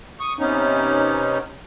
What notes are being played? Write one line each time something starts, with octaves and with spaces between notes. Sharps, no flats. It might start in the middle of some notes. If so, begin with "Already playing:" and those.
C#6 D#6
C3 B3 C#4 D#4